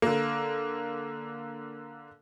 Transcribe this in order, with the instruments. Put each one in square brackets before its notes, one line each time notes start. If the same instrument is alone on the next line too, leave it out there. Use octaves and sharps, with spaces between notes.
[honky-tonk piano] D3 A#3